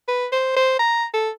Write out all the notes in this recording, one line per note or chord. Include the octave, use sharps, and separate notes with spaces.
B4
C5
C5
A#5
A4